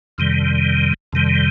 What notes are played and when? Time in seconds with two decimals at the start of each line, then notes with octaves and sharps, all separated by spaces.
0.18 F2 C3 D#3 G3
1.13 F2 C3 D#3 G3